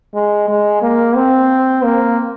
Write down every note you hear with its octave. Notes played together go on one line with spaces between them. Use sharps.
G#3
G#3
A#3
C4
A#3